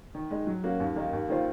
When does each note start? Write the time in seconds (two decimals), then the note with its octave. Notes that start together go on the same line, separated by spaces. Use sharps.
0.15 D#3
0.31 G#3 D#4
0.47 F#3
0.64 A#3 C#4 F#4
0.80 D#2
0.96 D#3 A#3 D#4
1.13 D#2
1.29 D#3 A#3 F4 C5